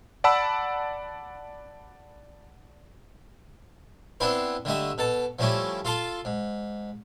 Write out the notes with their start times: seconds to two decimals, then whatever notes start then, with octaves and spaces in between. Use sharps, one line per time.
0.24 D5 F#5 A5 B5 E6
4.20 B3 C4 D4 E4 B4 C5
4.65 D3 G3 A3 D#5 E5
4.98 B2 A4 A5
5.39 F3 G3 A3 C#4 E4 G4
5.85 F4 A4 F5 A5 C6
6.25 G#2